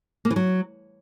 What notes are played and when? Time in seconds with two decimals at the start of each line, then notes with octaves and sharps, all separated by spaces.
0.25 A#3
0.30 E3
0.36 F#3